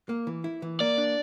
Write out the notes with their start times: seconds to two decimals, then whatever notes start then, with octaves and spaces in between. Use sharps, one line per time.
0.09 A#3
0.27 E3
0.44 E4
0.62 E3
0.80 A#3 D5
0.98 D4